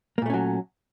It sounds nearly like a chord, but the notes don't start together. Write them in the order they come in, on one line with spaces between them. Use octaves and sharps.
A#3 A#2 A3 C#4 F#3